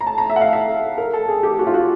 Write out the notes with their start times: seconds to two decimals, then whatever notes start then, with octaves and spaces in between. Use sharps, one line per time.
0.01 A#5
0.07 A5
0.18 A#5
0.30 E5
0.36 F#5
0.41 F5
0.53 E5
0.98 A#4
1.13 A4
1.28 G#4
1.43 G4
1.59 F#4
1.67 F4
1.74 F#4